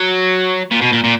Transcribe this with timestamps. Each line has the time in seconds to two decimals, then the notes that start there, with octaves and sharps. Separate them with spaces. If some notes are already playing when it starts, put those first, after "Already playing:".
Already playing: F#3
0.71 A#2
0.81 B2
0.92 A#2
1.04 A#2